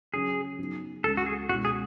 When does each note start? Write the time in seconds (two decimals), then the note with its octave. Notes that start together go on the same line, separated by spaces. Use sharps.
0.14 C#3 F#3 C#4 G#4
0.59 C#3 F#3 B3 D#4
1.03 C#2 C#3 G#3 A4
1.17 F#4
1.26 G#4
1.49 C#2 B2 G#3 C#4 E4 F#4
1.65 G#4